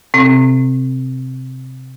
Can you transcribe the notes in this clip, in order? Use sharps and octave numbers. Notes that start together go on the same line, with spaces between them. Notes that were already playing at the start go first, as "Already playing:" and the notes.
C3 C4